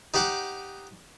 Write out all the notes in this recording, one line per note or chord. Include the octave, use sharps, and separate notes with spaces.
D#4 G4 C5 F#5 G5 D6